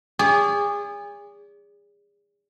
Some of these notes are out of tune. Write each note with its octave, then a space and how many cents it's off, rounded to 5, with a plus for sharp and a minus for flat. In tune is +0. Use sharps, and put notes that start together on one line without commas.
G#4 -30 D5 -40